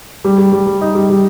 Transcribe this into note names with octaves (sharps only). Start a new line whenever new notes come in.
G3
G3
G3
G3
D#4
G3
G3